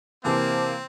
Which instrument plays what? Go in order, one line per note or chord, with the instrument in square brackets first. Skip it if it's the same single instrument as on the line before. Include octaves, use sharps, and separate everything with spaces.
[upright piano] C3 E3 [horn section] A#3 [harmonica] C4 [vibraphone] C5 A5 D6